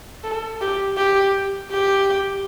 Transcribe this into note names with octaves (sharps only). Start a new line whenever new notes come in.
A4
G4
G4
G4